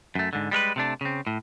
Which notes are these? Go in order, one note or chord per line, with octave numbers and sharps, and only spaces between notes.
F#2 A3
G#2 D3
G3 G#3 A#4 B4
C3 A3 D4
C#3 C4
A2